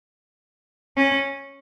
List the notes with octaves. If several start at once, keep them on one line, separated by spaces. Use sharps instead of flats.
C#4